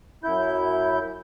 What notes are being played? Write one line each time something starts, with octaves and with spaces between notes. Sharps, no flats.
F#2 E4 G6